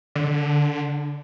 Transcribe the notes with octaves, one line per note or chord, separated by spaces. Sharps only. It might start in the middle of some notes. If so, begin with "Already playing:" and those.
D3